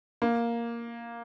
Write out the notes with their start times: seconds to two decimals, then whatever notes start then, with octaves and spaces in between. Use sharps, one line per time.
0.22 A#3